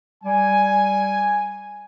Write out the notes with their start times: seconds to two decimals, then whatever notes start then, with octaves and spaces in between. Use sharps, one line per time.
0.24 G3 G#5